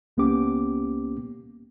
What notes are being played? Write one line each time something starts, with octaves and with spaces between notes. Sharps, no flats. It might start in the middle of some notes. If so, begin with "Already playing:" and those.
C#2 A#3 B3 C#4 G4 D6